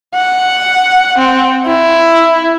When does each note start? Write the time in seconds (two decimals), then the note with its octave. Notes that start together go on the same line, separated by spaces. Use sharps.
0.15 F#5
1.18 C4
1.66 E4